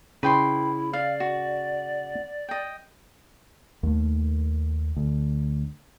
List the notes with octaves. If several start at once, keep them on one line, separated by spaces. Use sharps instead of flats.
C#3 E4 B4 G5 C6
D5 F5
F#4
D#5 G5
D#2 A3
D2